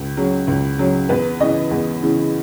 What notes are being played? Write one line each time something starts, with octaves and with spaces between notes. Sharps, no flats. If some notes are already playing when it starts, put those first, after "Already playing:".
Already playing: C#2
C#3 F#3 C#4
C#2
C#3 F#3 C#4
E2 B4
C#3 E3 D#5
E2
C#3 E3